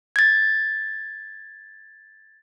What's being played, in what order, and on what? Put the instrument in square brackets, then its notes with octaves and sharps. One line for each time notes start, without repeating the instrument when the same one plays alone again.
[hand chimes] G#6 A6